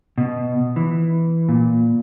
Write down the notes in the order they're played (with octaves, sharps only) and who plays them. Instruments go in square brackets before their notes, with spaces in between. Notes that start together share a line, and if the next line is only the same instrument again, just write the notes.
[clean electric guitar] B2
E3
A#2